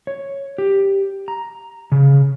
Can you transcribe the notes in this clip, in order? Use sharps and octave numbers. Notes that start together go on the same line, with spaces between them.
C#5
G4
A#5
C#3